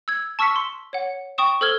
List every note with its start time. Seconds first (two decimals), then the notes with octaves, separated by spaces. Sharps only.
0.08 E6 G#6
0.39 A5 C#6 E6 F6 B6 C#7
0.56 C6
0.93 C#5 F#5
1.38 G5 C#6 D#6 E7
1.61 A4 C5 E6 F6 G#6 G7